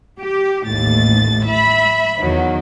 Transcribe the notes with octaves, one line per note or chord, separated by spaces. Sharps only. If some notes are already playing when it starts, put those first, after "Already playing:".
G4
A1 D#2 A2 A6
E5 B5
E2 D#3 F#3